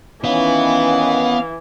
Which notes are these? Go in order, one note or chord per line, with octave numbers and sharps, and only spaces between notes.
D#3 E3 B3 C#4 F5